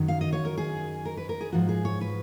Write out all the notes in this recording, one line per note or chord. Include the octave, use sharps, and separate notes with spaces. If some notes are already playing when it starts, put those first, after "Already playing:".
Already playing: F#2 D#3 F#3
F5
D#5
C#5
A#4
G#4
A#4
B4
A#4
G#4
G#2 F3 F#4
G#4
C#5
B4